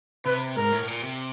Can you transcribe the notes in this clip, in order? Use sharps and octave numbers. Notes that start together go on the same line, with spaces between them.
C3 B4
G#2 A#4
A2
A2
A#2
C3